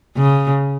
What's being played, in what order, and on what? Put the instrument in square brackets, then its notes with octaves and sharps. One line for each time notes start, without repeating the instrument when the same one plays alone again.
[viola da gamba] C#3